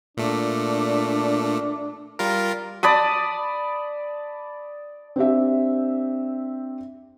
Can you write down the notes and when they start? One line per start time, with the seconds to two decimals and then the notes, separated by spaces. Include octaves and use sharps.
0.17 A#2 A3 D4
2.19 G3 F4 A#4
2.83 D5 A5 B5 D#6
5.16 C4 D4 G4 E5